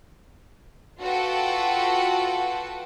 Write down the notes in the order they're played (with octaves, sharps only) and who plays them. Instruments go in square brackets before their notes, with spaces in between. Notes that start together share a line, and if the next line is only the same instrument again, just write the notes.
[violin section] F4 F#4 A4 B4 F#5 G5